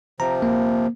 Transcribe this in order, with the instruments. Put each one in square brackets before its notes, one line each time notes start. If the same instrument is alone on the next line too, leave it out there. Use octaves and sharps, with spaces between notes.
[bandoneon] C3 F3 [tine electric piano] A#5
[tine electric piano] A#3